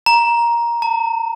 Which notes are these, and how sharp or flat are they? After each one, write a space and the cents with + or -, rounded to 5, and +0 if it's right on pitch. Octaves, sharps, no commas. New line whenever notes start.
A#5 +10
A#5 -45